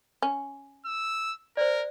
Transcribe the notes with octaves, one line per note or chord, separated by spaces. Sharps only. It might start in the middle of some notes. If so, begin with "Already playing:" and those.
C#4
E6
A#4 C5 D5